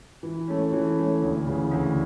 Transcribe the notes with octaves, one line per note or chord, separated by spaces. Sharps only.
E3
A3 C#4
E3
A3 C#4
D2
C#3 E3
D2